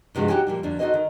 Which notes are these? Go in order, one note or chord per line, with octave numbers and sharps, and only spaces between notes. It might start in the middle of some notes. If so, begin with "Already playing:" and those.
G2 C3 F3 G#3 F#4
D#4 F#4 G4 C#5 G5 G#5
A#2 F3 G3
F2 D3 F#3 D4
D#4 F#4 G#4 A4 C5 D#5
D#3